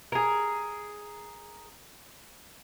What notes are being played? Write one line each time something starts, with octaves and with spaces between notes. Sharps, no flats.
G#4 A#4